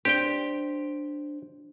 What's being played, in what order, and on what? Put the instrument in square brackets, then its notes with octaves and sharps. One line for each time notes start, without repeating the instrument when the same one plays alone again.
[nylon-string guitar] D4 C5 [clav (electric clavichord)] G4 G5